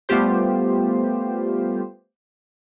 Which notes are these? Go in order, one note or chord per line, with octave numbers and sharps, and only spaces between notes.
G3 A3 B3 F4 G4 C5